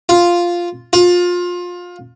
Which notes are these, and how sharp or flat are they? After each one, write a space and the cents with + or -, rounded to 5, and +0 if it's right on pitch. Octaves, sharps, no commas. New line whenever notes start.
F4 +0
F4 +25